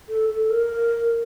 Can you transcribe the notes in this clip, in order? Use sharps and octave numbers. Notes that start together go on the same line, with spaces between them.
A4
A4
A#4